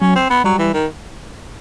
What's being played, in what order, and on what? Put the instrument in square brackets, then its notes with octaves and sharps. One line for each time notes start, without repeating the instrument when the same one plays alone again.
[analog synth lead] F#3 [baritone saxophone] C#4
[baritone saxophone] C4
B3
[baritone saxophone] F#3 [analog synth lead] G3
[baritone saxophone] E3
D#3